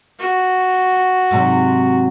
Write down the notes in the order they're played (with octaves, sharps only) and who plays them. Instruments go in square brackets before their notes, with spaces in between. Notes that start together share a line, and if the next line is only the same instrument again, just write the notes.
[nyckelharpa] F#4
[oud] G#2 C3 F#3